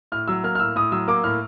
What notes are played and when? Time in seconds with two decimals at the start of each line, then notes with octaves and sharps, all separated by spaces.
0.12 A2 F6
0.28 F#3 E6
0.44 A#3 F6
0.55 F6
0.60 A2 E6
0.76 A2 D#6
0.92 F#3 E6
1.08 A#3 D6
1.24 A2 F6